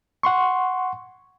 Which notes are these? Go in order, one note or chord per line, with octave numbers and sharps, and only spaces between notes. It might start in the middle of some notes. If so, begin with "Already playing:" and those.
F#5 C6 C#6